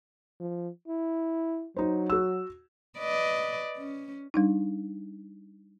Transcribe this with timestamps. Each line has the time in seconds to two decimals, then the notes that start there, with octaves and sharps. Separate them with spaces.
0.40 F3
0.88 E4
1.76 F#3 D#4 C5
2.10 F#4 E6
2.99 B4 D5 D#5
3.77 C#4
4.34 G3 D4 D#4